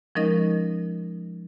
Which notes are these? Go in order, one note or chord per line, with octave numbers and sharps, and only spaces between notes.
F3 G#3 C#4 D#4 A#4 D#5